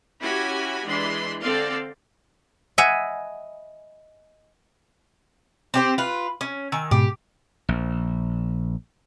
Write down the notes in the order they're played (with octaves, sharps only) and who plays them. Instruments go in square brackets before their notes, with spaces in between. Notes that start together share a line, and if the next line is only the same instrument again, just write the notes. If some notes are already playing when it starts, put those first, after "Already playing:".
[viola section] C#4 E4 F#4 G4 G#5 B5
E3 G#3 D4 B5 C6
D3 C4 A4 D5 F5 C6
[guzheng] D#5 E5 F#5 G#5 B5
[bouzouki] C4 G4 C5
F4 B4
C#4
[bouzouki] D#3 [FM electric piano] G#5 E6
[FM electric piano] G#2 B2 [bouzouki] G4
[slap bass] A#1